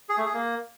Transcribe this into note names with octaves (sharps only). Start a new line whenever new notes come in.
G#4
A3
G#4
A#3